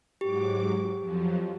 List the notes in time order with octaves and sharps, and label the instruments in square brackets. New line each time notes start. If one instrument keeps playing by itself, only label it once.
[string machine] G#2 F#3 D6 [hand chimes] G4
[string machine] F2 F3 F#3